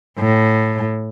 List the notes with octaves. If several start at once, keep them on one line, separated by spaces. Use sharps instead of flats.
A2